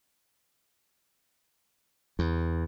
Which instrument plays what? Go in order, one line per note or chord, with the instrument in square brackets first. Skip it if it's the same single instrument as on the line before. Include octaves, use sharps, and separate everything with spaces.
[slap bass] E2